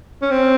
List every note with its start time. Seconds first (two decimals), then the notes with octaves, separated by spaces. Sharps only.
0.22 C#4
0.31 C4